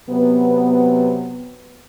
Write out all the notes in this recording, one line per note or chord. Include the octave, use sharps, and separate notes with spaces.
C3 F#3 B3